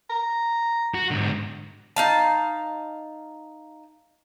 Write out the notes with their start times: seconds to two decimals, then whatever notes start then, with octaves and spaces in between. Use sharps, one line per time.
0.10 A#5
0.94 F#4
1.11 G#2 D3
1.96 D#4 F5 A5